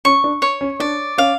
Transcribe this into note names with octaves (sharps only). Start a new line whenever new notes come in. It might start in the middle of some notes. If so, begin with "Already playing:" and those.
C#4 C#6
D4
C#5
C#4
D4 D5
C#4 F5